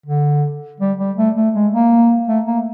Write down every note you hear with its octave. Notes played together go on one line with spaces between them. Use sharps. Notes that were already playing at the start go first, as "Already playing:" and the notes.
D3
G3
G3
A3
A3
G#3
A#3
A3
A#3